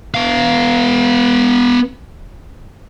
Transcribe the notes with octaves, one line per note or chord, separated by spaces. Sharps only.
B3 F5